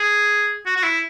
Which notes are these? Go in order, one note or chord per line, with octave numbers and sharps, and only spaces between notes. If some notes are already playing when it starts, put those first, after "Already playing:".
Already playing: G#4
F#4
F#4
E4